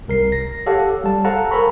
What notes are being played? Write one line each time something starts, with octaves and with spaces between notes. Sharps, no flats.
C2 A#4 C7
A#6
G4 A4 C#5 F5 F#5 A5
G3 A5
A4 C5 F5 F#5 A5 A#5
A4 A#4 G#5 A#5 B5 C#6